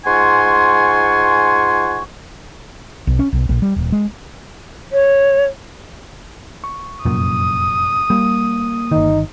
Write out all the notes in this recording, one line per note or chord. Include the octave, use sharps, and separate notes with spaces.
G#2 F4 F#5 G#5 C6 C#6
B1
C#4
B1
A#1
G3
D#1
G#3
C#5
C#6
F1 F#2 A#2 D#6
G3 A#3
G1 D#3 D#4